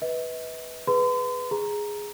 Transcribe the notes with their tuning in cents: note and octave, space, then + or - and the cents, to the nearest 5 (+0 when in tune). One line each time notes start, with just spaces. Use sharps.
B4 +0 D#5 +45
G#4 +5 B4 +0 C6 -45
G#4 +0 A#5 +0